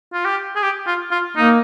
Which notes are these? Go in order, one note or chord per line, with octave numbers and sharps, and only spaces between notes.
F4
G4
G#4
G4
F4
F4
A#3 D#4